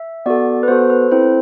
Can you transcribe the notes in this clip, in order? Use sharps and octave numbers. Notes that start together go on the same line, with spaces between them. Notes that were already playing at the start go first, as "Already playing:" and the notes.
Already playing: E5
B3 F#4 A4 D5
B4
B3 F#4 A4 C5
C5
B4
C4 E4 A4 C5